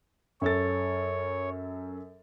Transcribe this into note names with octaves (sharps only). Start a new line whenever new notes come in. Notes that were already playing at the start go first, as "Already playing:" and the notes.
F#2 A4 C#5 A6